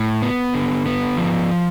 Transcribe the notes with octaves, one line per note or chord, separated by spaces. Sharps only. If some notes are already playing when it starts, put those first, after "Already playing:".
Already playing: A2
B3
D3
B3
F3